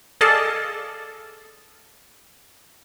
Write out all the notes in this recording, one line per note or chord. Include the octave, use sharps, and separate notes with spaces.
G#4 A4 D5 D#5 F5 A5